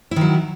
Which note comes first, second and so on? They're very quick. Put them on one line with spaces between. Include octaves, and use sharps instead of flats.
E4 D#3 F#3